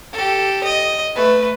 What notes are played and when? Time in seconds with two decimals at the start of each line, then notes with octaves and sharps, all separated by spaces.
0.13 G4 A4
0.64 D#5
1.15 A3 B4